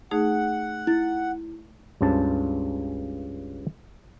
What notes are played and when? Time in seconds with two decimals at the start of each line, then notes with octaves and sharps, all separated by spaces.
0.11 A3 D#4 G#4 F#5
0.87 E4 A6
2.01 C#2 G2 C#3 C5 A5